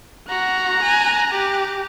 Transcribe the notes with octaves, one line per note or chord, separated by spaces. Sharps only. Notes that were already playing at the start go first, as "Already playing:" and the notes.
F#4 A#5 F#6
G#5
G4